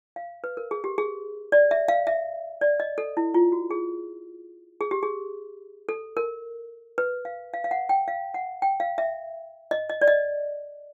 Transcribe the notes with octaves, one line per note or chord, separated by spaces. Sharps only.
F5
B4
A#4
G#4
G4
G#4
D5
E5
F5
E5
D5
D#5
A4
E4
F4
F#4
G#4
G#4
G4
G#4
A4
A#4
B4
F5
F5
F5
F#5
G5
F5
F#5
G5
F5
E5
D#5
D#5
D5
D#5